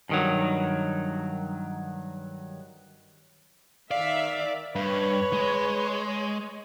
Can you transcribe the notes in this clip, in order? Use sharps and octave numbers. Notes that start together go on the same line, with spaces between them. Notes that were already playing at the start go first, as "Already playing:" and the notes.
G2 D#3 F#3
D#3 D5 E5 F5
G2 B4 C#5
G#3